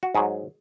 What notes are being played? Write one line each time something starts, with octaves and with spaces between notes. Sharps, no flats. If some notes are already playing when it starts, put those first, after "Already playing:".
F#4
G#2 F#3 G#4